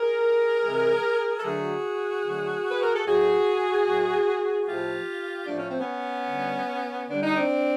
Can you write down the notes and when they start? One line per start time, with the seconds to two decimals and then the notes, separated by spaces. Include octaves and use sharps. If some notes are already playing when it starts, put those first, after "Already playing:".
Already playing: G#4 A#4
0.63 C3 E3 G#3
1.38 A4
1.43 D3 F#3 A3 F#4 G#4
2.24 D3 F#3 A3
2.71 B4
2.82 A#4
2.94 A4
3.05 A2 F#3 A3 F#4 G#4
3.86 A2 F#3 A3
4.67 A2 F3 A3 F4 G4
5.47 A2 F3 A3 D4
5.59 C#4
5.69 C4
5.80 B3 C#4
6.28 D3 G3
7.09 D3 G3 D4
7.23 D#4
7.36 C4 D4